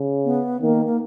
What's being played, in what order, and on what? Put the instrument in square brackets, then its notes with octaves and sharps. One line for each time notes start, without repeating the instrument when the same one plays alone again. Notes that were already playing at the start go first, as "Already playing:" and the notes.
Already playing: [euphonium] C#3
[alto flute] B3
[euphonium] D#3 [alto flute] A#3
[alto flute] A#3